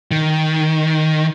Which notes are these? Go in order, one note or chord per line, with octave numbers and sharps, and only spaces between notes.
D#3